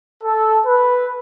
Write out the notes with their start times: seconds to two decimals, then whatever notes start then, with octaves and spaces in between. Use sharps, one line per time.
0.22 A4
0.65 B4